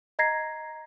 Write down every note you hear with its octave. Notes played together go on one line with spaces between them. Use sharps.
D#5 A#5 G#6 A#6 C7